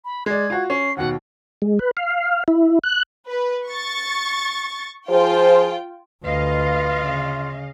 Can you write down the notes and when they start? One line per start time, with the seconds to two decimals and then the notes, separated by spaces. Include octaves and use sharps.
0.05 B5
0.26 G#3 D5 G#6
0.50 F4 F#4
0.70 C#4 C7
0.97 D#2 B2 F#5
1.62 G#3
1.79 B4
1.97 F5
2.48 E4
2.84 F#6
3.30 B4
3.67 C#6 A6
5.10 F3 F4 G#4 C5 G5
6.25 D2 F4 B4 D#5 F5
6.99 C#3